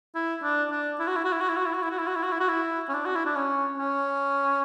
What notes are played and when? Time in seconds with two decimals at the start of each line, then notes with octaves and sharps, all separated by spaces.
0.15 E4
0.43 D4
0.71 D4
1.00 E4
1.08 F#4
1.16 E4
1.24 F#4
1.33 E4
1.41 F#4
1.49 E4
1.57 F#4
1.66 E4
1.74 F#4
1.83 E4
1.91 F#4
1.99 E4
2.07 F#4
2.16 E4
2.23 F#4
2.32 E4
2.40 F#4
2.49 E4
2.89 C#4
2.94 D4
3.06 F#4
3.16 E4
3.26 D4
3.36 C#4
3.78 C#4